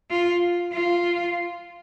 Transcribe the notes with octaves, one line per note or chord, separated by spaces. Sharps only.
F4
F4